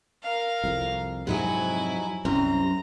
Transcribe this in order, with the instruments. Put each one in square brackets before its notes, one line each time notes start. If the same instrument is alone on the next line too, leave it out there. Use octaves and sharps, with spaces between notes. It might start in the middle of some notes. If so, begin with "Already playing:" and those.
[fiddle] A#4 F5
[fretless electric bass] C2 F2
[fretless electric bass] F2 G#2 C3 [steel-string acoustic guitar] F#3 D#4 F#4 [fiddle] E4 G#5
[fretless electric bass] C2 [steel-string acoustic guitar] F#2 C4 [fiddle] A#5